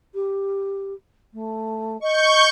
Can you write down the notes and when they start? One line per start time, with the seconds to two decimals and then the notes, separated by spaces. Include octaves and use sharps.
0.14 G4
1.33 A3
2.01 D#5 C#6 G6